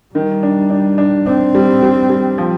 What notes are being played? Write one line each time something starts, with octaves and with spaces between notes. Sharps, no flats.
D#3 G3
D4
D4
D4
C4 D4
G3
G3
G3
F3